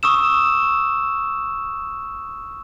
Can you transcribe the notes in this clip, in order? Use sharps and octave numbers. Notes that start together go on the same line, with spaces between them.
C#6 D#6 E6 E7